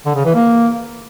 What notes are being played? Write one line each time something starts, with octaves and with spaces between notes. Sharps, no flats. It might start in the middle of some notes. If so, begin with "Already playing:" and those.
D3
C#3
E3
A#3